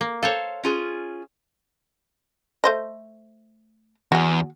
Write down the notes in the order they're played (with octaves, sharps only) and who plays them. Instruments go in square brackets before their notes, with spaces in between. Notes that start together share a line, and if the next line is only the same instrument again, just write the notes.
[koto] A#3
[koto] A4 C5 C#5 [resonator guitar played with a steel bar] F5
[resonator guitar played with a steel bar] C#4 F4 G#4
[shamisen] A3 C5 D#5
[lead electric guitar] E2 [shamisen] F#4 G#4